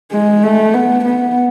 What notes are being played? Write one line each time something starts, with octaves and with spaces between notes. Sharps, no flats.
G#3
A3
B3
B3